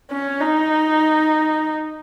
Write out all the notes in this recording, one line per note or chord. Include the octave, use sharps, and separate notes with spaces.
C#4
D#4